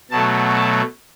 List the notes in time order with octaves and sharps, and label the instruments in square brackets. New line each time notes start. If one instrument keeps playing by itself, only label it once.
[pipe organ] B2 F#3 A3 A5
A5